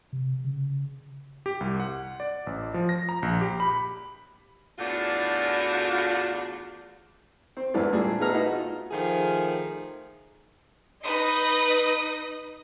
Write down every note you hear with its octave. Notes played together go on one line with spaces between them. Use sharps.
C3
C#3
G4
C2
F#5
D5
A1
F3
A#6
A#5
A#1
G4
B5
E2 A2 D4 F4 F#4
C4
E2 G#2 E3 D4
A#2 G3 A3 A#3 D4 G#4
A3 B3 D#4 G#4 A#5 F6
D#4 E4 F#4 B4
F4
D#3 F3 A3 G#4
D#4 B4 D#5 D#6